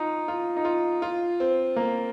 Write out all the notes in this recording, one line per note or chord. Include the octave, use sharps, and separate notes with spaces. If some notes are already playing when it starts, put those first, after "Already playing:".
Already playing: D#4 F4
F4
D#4
F4
F4
C4
A#3